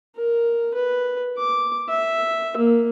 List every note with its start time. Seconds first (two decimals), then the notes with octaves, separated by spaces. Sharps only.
0.16 A#4
0.74 B4
1.38 D6
1.89 E5
2.57 A#3